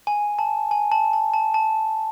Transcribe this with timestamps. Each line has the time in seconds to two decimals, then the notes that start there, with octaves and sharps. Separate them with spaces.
0.07 G#5
0.39 A5
0.71 G#5
0.92 A5
1.13 A5
1.33 A5
1.54 A5